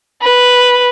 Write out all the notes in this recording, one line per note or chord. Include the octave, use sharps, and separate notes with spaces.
B4